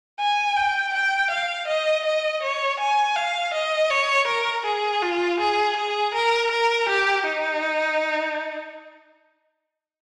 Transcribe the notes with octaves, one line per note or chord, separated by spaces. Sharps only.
G#5
G5
G5
F5
D#5
D#5
C#5
G#5
F5
D#5
C#5
A#4
G#4
F4
G#4
G#4
A#4
A#4
G4
D#4